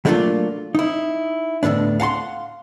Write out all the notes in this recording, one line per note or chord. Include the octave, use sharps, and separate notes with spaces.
F#3 G3 A3 A#3 D4 F4
D#4 E4
D2 A2 C3 B3 D4
F5 F#5 A5 C6